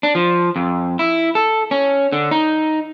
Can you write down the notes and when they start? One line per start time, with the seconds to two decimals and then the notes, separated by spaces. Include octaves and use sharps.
0.03 D4
0.15 F3
0.56 F2
0.99 E4
1.35 A4
1.71 C#4
2.12 D3
2.31 D#4